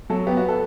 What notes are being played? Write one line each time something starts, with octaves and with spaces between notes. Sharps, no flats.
F#3 A4
B3 G4
F#4
A4